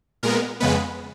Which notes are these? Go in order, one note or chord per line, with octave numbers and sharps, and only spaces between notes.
A#2 G#3 B3 A#4
F2 C#3 G#3 B3 B4